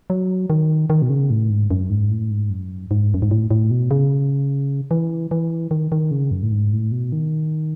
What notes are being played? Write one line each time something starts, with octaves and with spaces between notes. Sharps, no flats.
F#3
D#3
D#3
B2
C#3
A2
G#2
F#2
G#2
A2
G#2
F#2
G#2
F#2
G#2
A2
A2
B2
C#3
E3
E3
D#3
D#3
C#3
F#2
A2
G#2
A2
B2
D#3